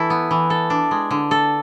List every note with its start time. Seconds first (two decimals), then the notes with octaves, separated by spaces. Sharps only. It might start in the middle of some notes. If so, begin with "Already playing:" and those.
Already playing: E3 E4 A4
0.10 B3
0.31 E3
0.50 A4
0.70 D4
0.91 G#3
1.11 D3
1.31 A4